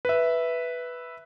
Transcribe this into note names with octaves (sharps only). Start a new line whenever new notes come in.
B4 E5